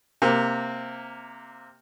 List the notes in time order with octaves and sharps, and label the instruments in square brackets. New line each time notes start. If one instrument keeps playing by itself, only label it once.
[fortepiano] C3 A#3